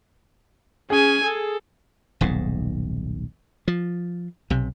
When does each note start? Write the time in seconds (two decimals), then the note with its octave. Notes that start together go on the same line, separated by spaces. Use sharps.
0.90 C#4 G#4 G#5
1.24 A4
2.21 D#1 B1 G#2
3.68 F3
4.50 B1 C3